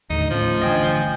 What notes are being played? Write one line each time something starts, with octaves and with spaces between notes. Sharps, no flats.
D#2 A2 D3 D#4
A2 F3 C#4
A1 G2 D3 D#5 G5 G#5